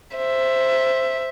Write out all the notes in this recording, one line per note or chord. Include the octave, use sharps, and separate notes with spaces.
C5 E5